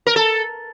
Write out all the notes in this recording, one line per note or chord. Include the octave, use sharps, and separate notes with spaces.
A#4
A4